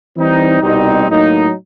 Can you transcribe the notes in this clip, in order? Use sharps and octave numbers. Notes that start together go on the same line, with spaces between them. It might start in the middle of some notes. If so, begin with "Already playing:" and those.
E3 G3 C4 D#4
C2 B2 G3 C4 D#4
A2 F#3 A#3 D#4